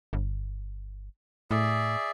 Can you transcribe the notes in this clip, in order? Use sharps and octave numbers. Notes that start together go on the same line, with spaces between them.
G1
A2 G#4 D5 E5